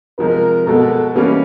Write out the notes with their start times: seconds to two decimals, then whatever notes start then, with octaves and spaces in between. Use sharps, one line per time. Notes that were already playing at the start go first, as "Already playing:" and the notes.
0.18 C3 F3 G#3 A#4
0.67 B2 G#3 B3 A4
1.15 E3 G3 A#3 C#4